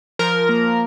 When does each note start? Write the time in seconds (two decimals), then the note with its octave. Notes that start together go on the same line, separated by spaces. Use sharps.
0.19 F3 A#4
0.49 A#3